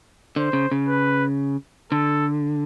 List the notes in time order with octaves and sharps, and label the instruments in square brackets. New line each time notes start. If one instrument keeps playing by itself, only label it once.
[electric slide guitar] D3 [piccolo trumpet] C5
[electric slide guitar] C#3
C#3
[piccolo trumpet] B4
[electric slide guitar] D3 [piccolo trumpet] A4